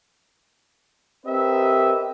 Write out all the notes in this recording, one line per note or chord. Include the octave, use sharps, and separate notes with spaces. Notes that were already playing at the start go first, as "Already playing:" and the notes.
C4 G4 A#4 B4 D#5 E5